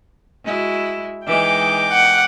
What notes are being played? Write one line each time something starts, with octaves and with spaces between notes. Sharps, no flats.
G#3 E4 F#4
E3 G#3 D#4 G5 D6
F#5